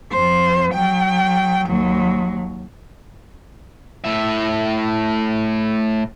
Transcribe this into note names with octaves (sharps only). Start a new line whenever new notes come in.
F2 C5
F#3 G5
D#2 F#3
A2 E5